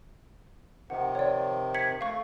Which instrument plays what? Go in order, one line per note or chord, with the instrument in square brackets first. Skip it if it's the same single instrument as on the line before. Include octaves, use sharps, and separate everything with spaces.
[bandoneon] C3 D#3 F3 [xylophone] F#5
[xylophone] C#5 D5
G#6 B6 C#7
[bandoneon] A3 [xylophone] F5 C#6